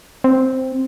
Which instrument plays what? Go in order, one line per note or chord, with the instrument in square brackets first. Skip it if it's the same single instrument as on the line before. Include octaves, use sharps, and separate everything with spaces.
[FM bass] C4